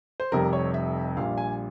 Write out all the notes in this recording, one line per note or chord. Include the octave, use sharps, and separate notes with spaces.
C5
F1 F2 C3 G3 A#4
C#5
E5
A#1 A#2 G3 F5
G#5